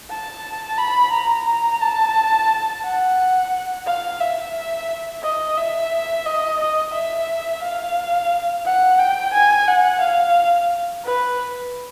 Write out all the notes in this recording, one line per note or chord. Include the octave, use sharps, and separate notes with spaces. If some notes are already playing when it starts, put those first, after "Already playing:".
A5
B5
A#5
A5
F#5
F5
E5
D#5
E5
D#5
D#5
E5
F5
F#5
G5
G#5
F#5
F5
B4